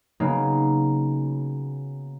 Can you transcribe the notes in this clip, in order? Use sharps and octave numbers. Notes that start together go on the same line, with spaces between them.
C#3 F#3 A#3 B3 D#4